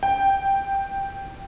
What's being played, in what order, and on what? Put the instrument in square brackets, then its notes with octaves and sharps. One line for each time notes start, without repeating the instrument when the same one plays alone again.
[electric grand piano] G5